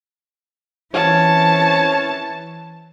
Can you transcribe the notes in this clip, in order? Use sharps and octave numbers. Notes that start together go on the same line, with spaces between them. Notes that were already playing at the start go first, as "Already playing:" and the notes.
E3 C4 C#4 C#5 A5